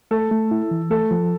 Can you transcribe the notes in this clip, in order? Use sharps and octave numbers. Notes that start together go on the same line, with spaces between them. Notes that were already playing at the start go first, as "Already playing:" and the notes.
A3 A4
A3
E4
E3
A3 A4
F3